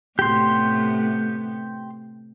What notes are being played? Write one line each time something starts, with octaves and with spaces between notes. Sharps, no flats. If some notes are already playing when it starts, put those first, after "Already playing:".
A2 C3 B3 G4 C6